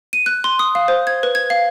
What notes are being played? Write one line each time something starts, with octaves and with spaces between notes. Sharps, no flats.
D#7
F#6
C6
D#6
F5
C5
G#6
B4
G#6
F5